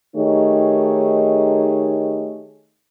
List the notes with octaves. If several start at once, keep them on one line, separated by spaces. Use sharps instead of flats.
D#3 A3 D#4 G4 G#4 C#5